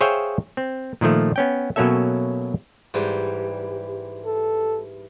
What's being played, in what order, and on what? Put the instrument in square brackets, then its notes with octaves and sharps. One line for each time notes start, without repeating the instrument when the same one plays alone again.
[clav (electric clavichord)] G#4 C5 C#5 E5 F5 G5
C4
A#2 D#3 F3 A3
B3 C#4 G5
B2 F#3 A#3 C#4 A4 E5
[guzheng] G#2 E3 G3
[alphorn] A4